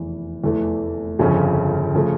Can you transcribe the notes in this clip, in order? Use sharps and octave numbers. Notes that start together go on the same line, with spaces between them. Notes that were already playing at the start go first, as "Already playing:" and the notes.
Already playing: F1 E2 E3
F1 E2 E3 A3
G1 F2 C#3 F3 C#4
C#3 F3 A3